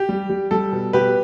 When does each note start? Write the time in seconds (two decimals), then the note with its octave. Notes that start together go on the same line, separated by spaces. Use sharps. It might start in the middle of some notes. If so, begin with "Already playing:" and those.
Already playing: G4
0.09 G3
0.30 G3
0.51 G3 A4
0.72 B2
0.93 B2 G4 B4